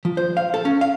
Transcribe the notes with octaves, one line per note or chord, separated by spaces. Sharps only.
F3
C5
F5
A4
C#4
F5